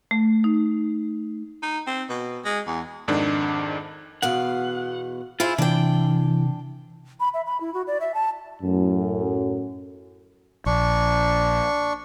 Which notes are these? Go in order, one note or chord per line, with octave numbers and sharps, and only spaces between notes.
A3
D#4
D#4
C4
B2
G#3
E2
F2 G#2 D#3 D4
E2 B2 F5 F#5
E4 F4 G#4 C5
C3 E3 D4 G5
B5
E5
B5
E4
F#4
D5
E5
A5
F#2 A2
A#1 D4 C#6